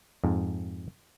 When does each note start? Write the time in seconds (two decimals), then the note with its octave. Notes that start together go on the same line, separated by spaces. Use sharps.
0.24 F2 G#2